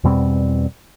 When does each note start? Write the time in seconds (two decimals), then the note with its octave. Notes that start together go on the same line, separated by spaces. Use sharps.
0.04 E2 B2 G3 C4